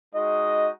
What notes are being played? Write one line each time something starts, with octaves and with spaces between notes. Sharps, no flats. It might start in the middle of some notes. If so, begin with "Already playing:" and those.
G#3 D#4 F#4 D#5